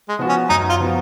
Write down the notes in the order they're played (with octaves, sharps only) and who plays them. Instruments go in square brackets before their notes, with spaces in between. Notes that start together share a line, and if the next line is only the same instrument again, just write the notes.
[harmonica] G#3
[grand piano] F3 B3 F#4
[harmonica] C#4
[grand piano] F#2 [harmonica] D#4
[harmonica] F4
[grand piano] F3 B3 F#4